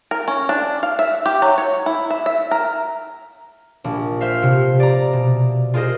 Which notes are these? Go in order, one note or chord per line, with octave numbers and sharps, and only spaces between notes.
A#4
C#4
D4
F5
E5
G4
F#3
C#5
E4
E5
E5
A#4
A#1
C5 E5 F5
C3
D5 A#5
B2
F4 G#4 A#4 C5 D#5